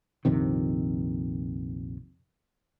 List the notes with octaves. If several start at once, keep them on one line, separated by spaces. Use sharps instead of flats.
A#1 F2 C3 D#3